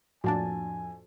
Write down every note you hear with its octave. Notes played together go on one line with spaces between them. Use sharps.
F2 A2 A#3 D4 F#4 G#5 A5